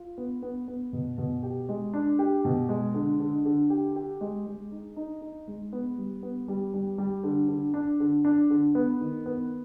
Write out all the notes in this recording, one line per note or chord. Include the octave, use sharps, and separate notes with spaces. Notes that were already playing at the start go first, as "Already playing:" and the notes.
Already playing: F4
B3
B3
B3
B2
B2
G4
G#3
D4
G4
B2
G#3
D3
D3
D3
G4
G4
G#3
G#3
D#4
D#4
D#4
G#3
B3
G3
B3
G3
G3
G3
D3
D3
D4
D3
D4
D3
B3
D#3
B3